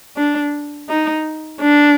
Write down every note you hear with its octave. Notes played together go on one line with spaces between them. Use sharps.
D4
D#4
D4